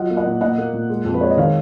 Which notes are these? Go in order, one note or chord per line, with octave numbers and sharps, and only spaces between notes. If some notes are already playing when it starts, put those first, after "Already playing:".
Already playing: F#3 F4 D#5 F#5
A#3
D#5 F#5
A#2
A#2 D#5 F#5
A#3
A#2
G#3
F2
B4
G#3 C#5
D#5
D#3 C#5 F5